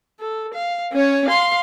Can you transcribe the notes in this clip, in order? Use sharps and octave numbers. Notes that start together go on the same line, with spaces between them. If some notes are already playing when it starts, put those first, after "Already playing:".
A4
F5
C#4 C#5
F5 C6